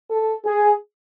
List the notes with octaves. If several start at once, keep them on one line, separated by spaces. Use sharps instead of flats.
A4
G#4